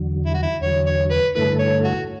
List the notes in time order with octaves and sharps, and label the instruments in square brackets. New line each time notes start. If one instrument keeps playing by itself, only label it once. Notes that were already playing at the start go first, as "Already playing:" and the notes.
Already playing: [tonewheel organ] E2 D3 F#3
[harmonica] E4
F#4
E4
[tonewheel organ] E2 D3 F#3 [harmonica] C#5
[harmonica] C#5
B4
[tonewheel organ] G2 D3 A3 E4 A4 [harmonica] B4
[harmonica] C#5
F#4